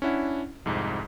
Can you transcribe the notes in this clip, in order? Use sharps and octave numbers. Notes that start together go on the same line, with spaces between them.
C#4 D4 E4 F#5
C2 F2 G#2